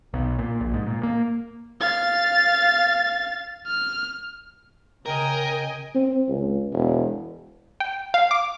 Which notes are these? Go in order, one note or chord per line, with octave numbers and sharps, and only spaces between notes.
B1
A#2
A#1
G#2
A#2
A#3
F5 A6
F6
C#3 A#4 D#5 G5 G#5
C4
C#2
E1
G5
F5
D6